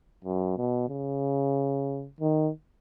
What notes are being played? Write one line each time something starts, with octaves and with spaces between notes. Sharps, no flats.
F#2
B2
C#3
D#3